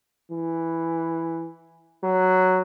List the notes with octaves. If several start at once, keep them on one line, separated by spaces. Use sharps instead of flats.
E3
F#3